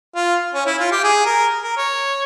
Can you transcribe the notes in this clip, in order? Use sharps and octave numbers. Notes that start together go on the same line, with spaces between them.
F4
C#4
E4
F4
G4
G#4
A#4
A#4
C#5